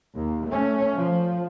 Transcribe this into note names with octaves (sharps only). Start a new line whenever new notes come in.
D#2
A3 C#4
F3